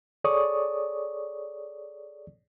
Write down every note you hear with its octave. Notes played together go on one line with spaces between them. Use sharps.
G#4 A4 C#5 D5 C#6 D#6